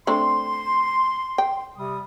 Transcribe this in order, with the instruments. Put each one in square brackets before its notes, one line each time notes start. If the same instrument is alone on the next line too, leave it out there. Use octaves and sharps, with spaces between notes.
[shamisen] A3 C4 D4 [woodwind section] C6
[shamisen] G5
[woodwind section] C3 G3 D#6